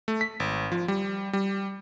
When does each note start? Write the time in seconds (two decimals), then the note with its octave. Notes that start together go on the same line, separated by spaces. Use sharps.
0.08 A3
0.21 B6
0.40 G#1
0.72 F3
0.88 G3
1.33 G3